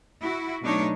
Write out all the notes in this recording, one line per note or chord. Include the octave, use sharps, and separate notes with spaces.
E4 F#4
B2 F#3 A3 D4 D#4 C#5